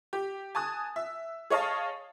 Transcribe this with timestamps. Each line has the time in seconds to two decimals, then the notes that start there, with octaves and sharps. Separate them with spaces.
0.13 G4
0.55 G#5 A5 D#6 F#6
0.96 E5
1.50 G#4 C#5 D#5 F5 A5